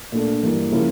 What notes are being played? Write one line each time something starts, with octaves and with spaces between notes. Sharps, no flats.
A#2 A3 D4
G2 E3 A#3
C#3 F3 A#3 E4 A#4